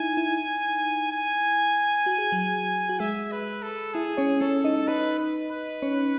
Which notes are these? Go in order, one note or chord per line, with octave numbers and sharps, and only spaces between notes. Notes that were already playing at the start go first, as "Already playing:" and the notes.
Already playing: D#4 E4 G#5
E4
G#5
F#4
G#4
F#3 F#4
F#4
G#3 G#4 E5
B4
A4
E4 G#4
C#4 C#5
C#4 A4 C#5
D#4 D#5
D#4 B4 D#5
B4
B4
C#4 C#5